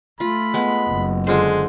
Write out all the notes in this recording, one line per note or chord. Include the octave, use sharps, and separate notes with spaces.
A3 F4 B5
G#3 B3
F#1
D3 G#3 F4 C5